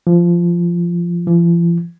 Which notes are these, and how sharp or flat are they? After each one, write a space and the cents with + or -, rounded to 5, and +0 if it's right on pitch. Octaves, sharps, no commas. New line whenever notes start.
F3 -15
F3 -45